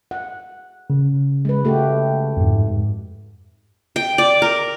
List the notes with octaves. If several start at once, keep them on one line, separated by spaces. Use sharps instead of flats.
F#5
C#3
G#3 B4
A3 F#4 G4
F2 G#2
G5
D5
A#4